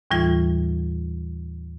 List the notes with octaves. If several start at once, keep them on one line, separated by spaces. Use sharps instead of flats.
D#2 A2 E3 G3 F4 G#6